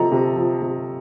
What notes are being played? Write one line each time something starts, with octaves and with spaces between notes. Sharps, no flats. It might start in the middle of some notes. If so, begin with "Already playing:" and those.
Already playing: C3 F3 A4 D#5 A#5
C3
F3
C3